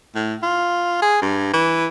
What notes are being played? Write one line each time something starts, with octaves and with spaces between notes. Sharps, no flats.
A2
F4
G#4
G2
E3